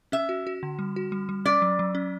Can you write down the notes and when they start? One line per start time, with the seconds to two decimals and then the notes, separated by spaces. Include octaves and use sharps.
0.12 C#4 E5
0.29 F#4
0.47 F#4
0.63 D3
0.79 G3
0.96 F#4
1.12 G3
1.29 G3
1.45 C#4 D5
1.62 F#3
1.79 F#3
1.95 C#4